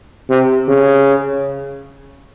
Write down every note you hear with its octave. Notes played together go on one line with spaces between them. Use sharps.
C3
C#3